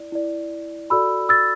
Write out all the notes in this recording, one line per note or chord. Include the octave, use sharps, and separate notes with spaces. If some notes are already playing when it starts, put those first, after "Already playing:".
Already playing: E4 D5
E4 D5
F#4 A4 D5 B5 E6
E6 A6